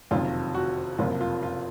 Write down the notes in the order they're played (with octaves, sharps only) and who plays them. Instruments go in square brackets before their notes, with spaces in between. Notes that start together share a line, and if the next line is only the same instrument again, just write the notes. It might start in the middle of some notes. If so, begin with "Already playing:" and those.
[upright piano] F#1 F2 C3 D#3 F4
F#4
F#1 F2 C3 F3 A#3 F4
F4
F4